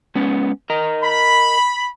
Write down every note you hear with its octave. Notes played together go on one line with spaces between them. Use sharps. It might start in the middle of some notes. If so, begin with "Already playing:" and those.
G#3 B3 C#4
A#4 D#5 A#5
B5